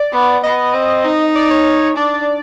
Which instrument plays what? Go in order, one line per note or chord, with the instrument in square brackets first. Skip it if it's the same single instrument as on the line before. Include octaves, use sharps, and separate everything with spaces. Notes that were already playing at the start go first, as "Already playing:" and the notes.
Already playing: [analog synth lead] D5
[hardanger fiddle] B3
[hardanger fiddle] B3 [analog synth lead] D#5
[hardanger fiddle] C4
D#4
[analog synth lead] D5
C#5
[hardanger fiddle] D4 [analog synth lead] D5